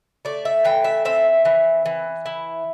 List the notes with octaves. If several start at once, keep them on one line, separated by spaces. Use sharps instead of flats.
A3 D5
E5
E3 G5
E5
C4 E5
E3
E3
E4